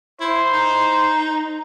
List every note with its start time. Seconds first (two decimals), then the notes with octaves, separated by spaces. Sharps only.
0.20 E4 C5
0.53 D#4